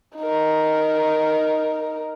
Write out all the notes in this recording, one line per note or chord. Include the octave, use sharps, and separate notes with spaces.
D#4 A#4